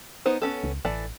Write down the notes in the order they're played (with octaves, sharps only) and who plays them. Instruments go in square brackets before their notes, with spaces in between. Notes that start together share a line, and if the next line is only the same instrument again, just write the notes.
[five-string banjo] B3 D#4 C5
B3 C#4 A4
[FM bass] C#2
[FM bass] A1 [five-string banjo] E3 A4 D5